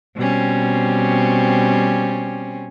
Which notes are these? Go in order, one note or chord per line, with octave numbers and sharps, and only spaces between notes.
B2 G3 C4 C#4